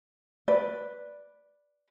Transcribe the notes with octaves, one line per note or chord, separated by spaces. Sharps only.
B4 D5